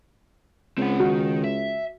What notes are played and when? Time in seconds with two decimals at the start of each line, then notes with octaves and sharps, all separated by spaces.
0.78 C#2 C4 F#5
1.00 D#3 F#4
1.44 E5